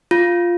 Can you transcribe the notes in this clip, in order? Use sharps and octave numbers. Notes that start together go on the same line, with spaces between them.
F4